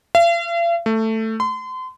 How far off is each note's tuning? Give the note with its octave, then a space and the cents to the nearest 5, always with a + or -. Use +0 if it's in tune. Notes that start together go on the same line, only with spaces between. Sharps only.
F5 -45
A3 +10
C6 -35